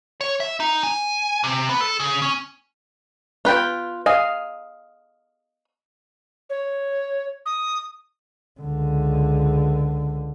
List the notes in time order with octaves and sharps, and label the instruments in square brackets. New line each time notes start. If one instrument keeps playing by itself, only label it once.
[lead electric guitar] C#5
E5
D#4
G#5
C3
B3
A4
C#3
C#4
[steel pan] B3 G5 [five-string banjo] F4 B4
[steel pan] D#5 F5 [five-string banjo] G#5
[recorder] C#5
D#6
[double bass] C#2 D3